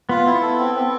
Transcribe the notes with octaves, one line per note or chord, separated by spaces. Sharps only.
B3 F4
B3 E4
A4
C4
C4